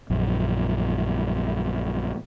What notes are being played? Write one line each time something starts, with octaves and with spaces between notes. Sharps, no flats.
A#1 F#2